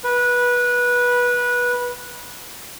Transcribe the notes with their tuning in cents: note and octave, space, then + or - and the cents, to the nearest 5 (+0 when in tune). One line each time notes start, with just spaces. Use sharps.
B4 -20